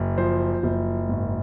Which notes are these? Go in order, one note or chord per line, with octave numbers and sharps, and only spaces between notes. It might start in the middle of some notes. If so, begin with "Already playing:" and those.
Already playing: F#1
F3 C5
F#1
G#1